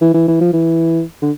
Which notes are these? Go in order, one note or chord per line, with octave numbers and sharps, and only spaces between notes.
E3
E3
E3
F3
E3
D3